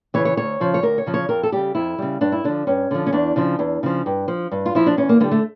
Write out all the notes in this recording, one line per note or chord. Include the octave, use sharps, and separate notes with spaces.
C#3 E3 C#5
C#5
D2 C#5
C#3 F3
C#5
D2 A#4
C#5
C#3 F3
C#5
F2 A#4
A4
C#3 G3 G4
F2 E4
C#3 G3
G2 D4
E4
D3 F3 D4
G2 C#4
D3 F3
C#4
E2 D4
C#3 F3
E2
C#3 F3
G2
F3
G2
F4
F3 E4
D4
E2 C#4
A#3
D3 G3 A#3
A3